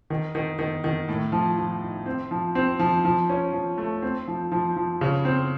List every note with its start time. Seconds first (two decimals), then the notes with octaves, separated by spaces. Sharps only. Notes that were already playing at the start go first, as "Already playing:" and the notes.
0.10 D#3
0.35 D#3
0.59 D#3
0.84 D#3
1.08 A2
1.32 F3
1.57 F3
1.82 D#4
2.06 C4
2.31 F3
2.55 C4
2.79 F3
3.05 F3
3.30 C#4
3.53 F3
3.78 A3
4.02 C4
4.28 F3
4.52 F3
4.76 F3
5.01 C#3
5.25 C4